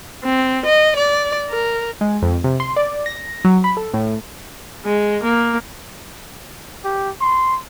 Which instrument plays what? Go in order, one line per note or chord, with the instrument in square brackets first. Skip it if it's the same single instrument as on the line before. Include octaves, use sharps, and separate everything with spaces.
[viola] C4
D#5
D5
A#4
[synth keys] G#3
F2
C3
C6
D5
A#6
F#3
B5
A4
A2
[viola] G#3
A#3
[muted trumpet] G4
C6